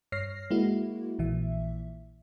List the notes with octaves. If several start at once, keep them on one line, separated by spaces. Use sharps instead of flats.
G2 C#5 F6 A#6 C7
G#3 A#3 E4 F#4
A#1 A#2 E3 E5